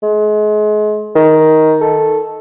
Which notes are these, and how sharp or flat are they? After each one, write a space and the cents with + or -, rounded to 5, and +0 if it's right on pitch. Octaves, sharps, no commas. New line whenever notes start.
G#3 +35
D#3 +10
A4 -5